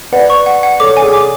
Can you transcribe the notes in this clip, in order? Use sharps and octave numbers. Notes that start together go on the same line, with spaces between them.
B4 D5 F#5
C#6
F#5
F#5
A4 C#5 D6
G#5
G#4
D6